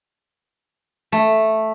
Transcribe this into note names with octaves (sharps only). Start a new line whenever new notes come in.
A3